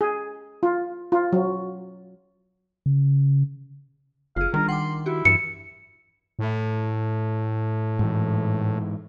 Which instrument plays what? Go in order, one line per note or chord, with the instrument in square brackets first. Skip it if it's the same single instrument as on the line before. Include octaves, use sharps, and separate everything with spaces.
[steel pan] G#4
F4
F4
F#3
[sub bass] C#3
[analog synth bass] F#1 [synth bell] F4 G#4 [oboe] F5
[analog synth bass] D#3 [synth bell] G3 D4 [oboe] A#4
[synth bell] F#5 G5 D6 [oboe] C6
[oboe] E4 [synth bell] F#4 G4
[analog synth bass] G2 [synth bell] E3 E7 [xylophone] C#7
[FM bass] A2
[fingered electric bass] G#2 E3